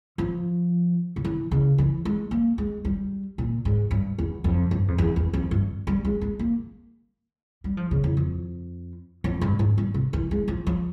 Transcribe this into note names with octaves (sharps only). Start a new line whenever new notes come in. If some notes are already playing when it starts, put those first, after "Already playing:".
F3
C#3
E3
C#3
E3
G#3
A#3
G#3
G3
A#2
G#2
G2
E2
F2
G2
F2
E2
E2
F2
G2
G3
G#3
G#3
A#3
G3
F3
C#3
E2
F2
F2
G2
G#2
G3
C3
E3
G#3
F3
F3